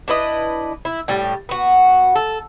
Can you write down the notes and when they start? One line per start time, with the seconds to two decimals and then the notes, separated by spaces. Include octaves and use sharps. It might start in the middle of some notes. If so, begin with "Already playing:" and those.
0.08 D4 E4 B4 D#5
0.85 E4
1.08 A2 G3
1.49 B3 F#4
2.16 A4